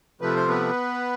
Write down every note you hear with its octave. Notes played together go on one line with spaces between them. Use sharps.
C3 F3 A3 B4
C5
B3 B4